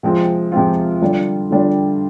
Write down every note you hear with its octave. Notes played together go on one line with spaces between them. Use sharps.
C3 F3 G#3 C4 F4
C3 F3 G#3 C4 F4
D3 G3 D4 F4
D3 G3 D4 F4